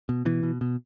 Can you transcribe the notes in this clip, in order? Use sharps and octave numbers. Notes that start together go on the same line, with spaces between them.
B2
B2 E3
B2
B2